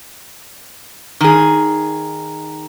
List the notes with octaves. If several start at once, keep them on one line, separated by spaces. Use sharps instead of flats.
D#3 G#4